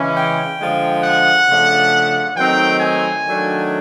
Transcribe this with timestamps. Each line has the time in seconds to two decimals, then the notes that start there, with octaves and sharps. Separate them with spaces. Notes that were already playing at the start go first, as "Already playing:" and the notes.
Already playing: C#3 E3 G#3 C#4
0.16 G5
0.60 D3 F3 G#3
1.04 F#5
1.48 C#3 F3 A3 D4
2.36 D#3 F#3 A3 C4 D#4 G5
2.81 G#5
3.25 D#3 F#3 A3 D4